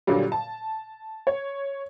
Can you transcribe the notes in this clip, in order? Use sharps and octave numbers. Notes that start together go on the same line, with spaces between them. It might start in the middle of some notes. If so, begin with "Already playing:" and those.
A#2 D3 F#3 G3
A5
C#5